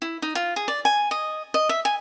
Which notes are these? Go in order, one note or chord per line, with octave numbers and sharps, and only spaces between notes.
E4
D#4
F4
G#4
D5
G#5
D#5
D#5
E5
G#5